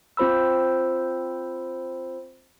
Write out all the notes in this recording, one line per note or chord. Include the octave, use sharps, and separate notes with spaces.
C4 F4 C5 B5 E6